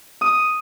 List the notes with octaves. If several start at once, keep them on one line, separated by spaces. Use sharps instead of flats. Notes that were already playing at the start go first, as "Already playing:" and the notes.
D#6